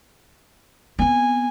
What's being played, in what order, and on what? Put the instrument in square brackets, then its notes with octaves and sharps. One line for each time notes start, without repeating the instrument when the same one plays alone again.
[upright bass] B3 C4 [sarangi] G#5